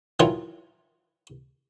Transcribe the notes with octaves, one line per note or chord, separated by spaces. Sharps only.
D#3 E3 F#3 E4 F4